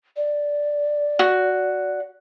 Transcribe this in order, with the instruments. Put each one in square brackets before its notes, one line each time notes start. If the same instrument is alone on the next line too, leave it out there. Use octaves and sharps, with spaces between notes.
[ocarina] D5
[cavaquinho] F#4